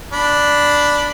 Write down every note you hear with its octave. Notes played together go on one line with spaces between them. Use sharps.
D4 B5